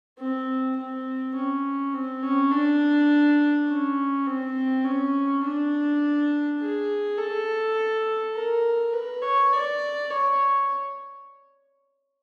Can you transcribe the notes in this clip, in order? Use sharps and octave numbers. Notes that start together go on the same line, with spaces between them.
C4
C4
C#4
C4
C#4
D4
C#4
C4
C#4
D4
G#4
A4
A#4
B4
C#5
D5
C#5